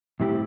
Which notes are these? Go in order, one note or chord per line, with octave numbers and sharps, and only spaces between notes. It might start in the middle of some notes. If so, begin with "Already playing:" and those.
A2 G3 C4 E4 G4